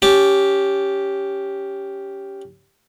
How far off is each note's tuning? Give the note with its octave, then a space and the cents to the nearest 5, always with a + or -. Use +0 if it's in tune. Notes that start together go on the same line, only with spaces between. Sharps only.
C#4 +15 G4 +0 A5 -10